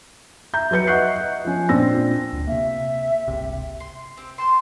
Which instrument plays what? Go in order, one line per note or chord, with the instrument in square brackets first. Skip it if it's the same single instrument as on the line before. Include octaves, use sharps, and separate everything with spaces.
[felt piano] E5 A#5 G6
F#3 B4 G6 C#7
D#5 E5 F#5 C#6 F#6 C7
D#5
F3 C#4
A#2 C4 D4 E6 A#6
[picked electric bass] D2
[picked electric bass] C3 A#3 [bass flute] E5
[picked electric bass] G1 C#2 C3
[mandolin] C6
C4 G4
C5 G5 A5 C6